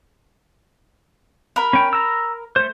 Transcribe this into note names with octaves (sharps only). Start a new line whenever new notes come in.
A#4 B5
C#4 G5
A#5 E6
A3 C5